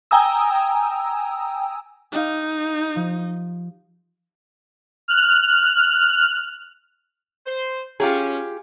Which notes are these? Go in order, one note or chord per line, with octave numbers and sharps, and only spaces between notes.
G5 G#5 A#5 D#6 E6
D#4 G4 D#5 F5
F3
F6 F#6
C5
C#4 F4 G4 G#4